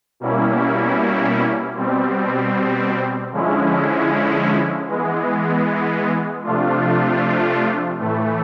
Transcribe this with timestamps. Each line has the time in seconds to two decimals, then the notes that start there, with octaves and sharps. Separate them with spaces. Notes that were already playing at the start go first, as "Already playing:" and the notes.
0.20 B2 G3 A#3 C#4 E4
1.75 B2 G3 C4
3.32 D3 F3 G#3 C#4 E4
4.87 E3 G#3 B3
6.43 C3 F3 A3 D4 F4
7.99 A2 E3 A3